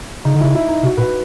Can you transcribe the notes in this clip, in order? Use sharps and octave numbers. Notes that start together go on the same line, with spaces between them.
C#3 D#4
D3
C#3 E4
E4
D#4
C3 F#4
A#2 B4